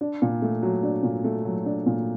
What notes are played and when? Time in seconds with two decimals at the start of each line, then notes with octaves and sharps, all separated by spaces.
0.01 D4
0.22 A#2
0.42 A3
0.63 F#3
0.83 D4
1.03 A#2
1.24 A3
1.45 F#3
1.66 D4
1.86 A#2